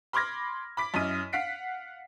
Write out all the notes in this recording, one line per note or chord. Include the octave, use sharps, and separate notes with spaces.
B5 C6 D6 F6 G#6 A#6
B5 D6 B6
F#2 E4 D#5 D#7
F5 F#5 B6 C7 D7